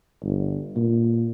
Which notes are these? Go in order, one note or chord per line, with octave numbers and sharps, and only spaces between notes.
G1
A#2